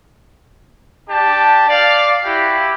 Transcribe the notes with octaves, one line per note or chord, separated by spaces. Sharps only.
D4 G4 A5
D5 F5
E4 F#4 G4